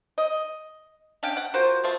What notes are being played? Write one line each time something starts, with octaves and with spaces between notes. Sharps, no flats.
D#5
C#4 D4 F5 G5
F#5
F4 F#4 A#4 C5
A3 F4 C5